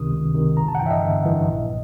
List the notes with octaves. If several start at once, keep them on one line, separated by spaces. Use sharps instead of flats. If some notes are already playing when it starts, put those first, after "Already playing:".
Already playing: C#2 C3 D#3 D#6
C#2
C3 D#3
G1 A#5
A5
F#5
G2 E3 E5 G5
D#5
G1
G2 E3
A#1